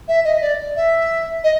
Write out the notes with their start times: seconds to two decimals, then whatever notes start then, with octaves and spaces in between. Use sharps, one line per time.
0.08 E5
0.25 D#5
0.41 D5
0.76 E5
1.44 D#5